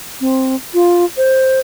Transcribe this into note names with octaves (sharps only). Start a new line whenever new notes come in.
C4
F4
C5